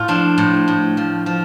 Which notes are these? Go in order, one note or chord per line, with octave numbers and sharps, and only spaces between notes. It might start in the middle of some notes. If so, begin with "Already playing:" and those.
Already playing: A2 F4
F3 D4
A2
A2
F3
F3